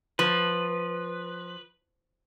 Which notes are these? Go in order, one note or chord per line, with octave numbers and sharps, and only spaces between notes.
F3 B4